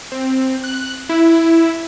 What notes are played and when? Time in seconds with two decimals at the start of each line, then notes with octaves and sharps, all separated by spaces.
0.12 C4
0.64 F#6
1.09 E4